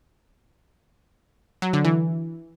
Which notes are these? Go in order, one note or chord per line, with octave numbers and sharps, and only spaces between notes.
F#3
D3
E3